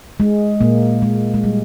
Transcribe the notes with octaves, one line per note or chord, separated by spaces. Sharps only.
G#3
A#2 A#3
G#3
G#3
G3